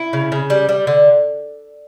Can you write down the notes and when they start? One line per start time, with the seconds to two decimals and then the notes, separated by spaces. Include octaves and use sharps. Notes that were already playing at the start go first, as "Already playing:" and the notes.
Already playing: E4
0.13 C#3
0.32 C#3
0.50 G3
0.69 G3
0.87 D3